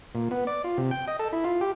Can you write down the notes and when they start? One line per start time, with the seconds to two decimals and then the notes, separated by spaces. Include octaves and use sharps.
0.15 A#2
0.31 B3
0.47 D5
0.64 F4
0.78 C3
0.91 G5
1.08 D#5
1.19 A4
1.33 E4
1.44 F4
1.61 G4